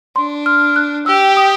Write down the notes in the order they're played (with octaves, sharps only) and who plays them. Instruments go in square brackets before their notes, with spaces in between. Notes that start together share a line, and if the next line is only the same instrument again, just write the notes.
[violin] D4 [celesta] C6
[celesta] F6
F#6
[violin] G4 [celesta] E6
[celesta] D#6